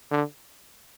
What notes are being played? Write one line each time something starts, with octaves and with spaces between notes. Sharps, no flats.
D3